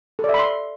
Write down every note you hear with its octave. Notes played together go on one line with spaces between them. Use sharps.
A4
D5
E5
B5
C6